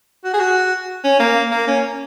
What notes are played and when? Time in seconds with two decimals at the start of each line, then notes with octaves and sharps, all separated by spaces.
0.24 F#4
0.34 G#4
0.40 F#4
1.04 C#4
1.20 A#3
1.51 A#3
1.67 C#4